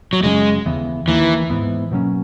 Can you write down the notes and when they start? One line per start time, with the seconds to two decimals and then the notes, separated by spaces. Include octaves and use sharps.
0.13 F#3
0.24 F#2 C#3 F#3 G#3 C#4
0.66 D#2 C#3 E3 B3
1.08 D#2 D#3 E3 A#3
1.50 G#2 E3 B3
1.91 B2 F#3 A#3 C#4